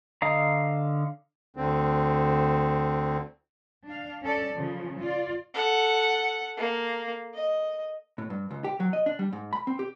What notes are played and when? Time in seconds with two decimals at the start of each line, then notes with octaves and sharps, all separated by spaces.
0.22 D3 D#5 F5 A#5
1.57 D2 D3 C4
3.86 D4 F5
4.23 C#4 A4 D5
4.54 C#3 F3
5.01 F4 D5
5.54 A4 F#5
6.57 A#3
7.34 D#5
8.18 A2
8.30 G2
8.51 C#2
8.64 G4
8.80 F#3
8.93 D#5
9.06 D4
9.19 G3
9.33 G#2
9.53 B5
9.67 C4
9.79 G4